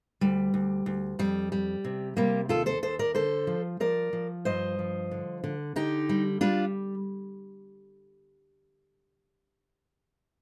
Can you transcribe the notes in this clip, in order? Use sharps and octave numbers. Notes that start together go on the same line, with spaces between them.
D2 G3
D2
D2
F2 G3
G3
C3
C3 G3 A#3
D#2 F4 A4
A4 C5
D#2 A4 C5
A#4 D5
D3 A4 C5
F3
F3 A#4 D5
F3
G2 C5 D#5
F3
D3
D3
D3 D#4 G4
G3
G3 D4 F4